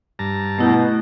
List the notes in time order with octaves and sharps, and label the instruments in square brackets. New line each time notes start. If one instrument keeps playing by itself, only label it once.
[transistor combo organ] G2 A5 A#5
[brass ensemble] B2 [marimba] A3 E4 G6